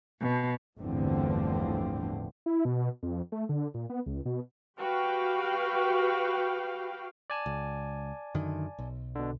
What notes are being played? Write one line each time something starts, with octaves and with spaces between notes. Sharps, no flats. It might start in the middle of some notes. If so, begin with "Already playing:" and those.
B2
G1 E2 A2 D3 F3 C4
E4
B2
F2
A3
D3
A#2
B3
C#2
B2
F#4 G4 B4 F5 G5
D5 G#5 A5
C#2
F#2 D3 D#3
B1
B2 D3